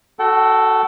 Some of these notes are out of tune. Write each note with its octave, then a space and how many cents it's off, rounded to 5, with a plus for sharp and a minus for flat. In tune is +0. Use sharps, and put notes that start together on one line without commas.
F#4 +0 A4 +0 G5 -45